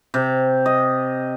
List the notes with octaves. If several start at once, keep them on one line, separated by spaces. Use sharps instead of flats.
C3
D#5